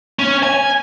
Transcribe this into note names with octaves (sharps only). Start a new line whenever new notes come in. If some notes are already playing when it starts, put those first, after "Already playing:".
C#4
G#5